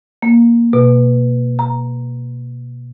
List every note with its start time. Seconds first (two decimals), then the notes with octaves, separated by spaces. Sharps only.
0.22 A#3
0.73 B2
1.59 A#5